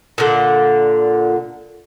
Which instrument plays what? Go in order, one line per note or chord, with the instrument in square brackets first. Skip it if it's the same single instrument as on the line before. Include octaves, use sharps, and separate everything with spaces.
[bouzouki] A#2 D3